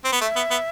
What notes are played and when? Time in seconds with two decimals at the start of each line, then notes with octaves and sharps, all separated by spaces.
0.04 C4
0.13 B3
0.21 A3 E5
0.36 B3
0.51 B3